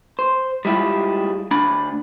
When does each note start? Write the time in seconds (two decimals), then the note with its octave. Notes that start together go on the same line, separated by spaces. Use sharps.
0.19 C5
0.65 G3 G#3 E4 F4 G4
1.51 D2 D4 B5